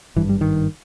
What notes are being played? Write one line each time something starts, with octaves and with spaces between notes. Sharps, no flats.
G#1 G2 E3
G3
D#3